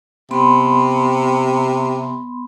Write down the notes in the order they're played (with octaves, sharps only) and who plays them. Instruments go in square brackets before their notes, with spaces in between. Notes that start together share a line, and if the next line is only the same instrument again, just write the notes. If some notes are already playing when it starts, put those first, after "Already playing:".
[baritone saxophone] C3 [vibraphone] B3 B5 C6